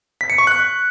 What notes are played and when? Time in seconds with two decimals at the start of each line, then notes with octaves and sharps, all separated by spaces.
0.21 B6
0.30 C#7
0.38 C#6
0.47 F#6